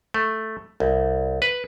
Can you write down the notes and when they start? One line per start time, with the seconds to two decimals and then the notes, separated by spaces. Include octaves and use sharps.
0.14 A3
0.80 C2
1.42 B4